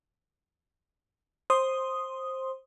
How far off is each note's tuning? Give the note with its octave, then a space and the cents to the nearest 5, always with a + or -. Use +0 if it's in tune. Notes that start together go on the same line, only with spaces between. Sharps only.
C5 +15 C6 +0 D#6 +0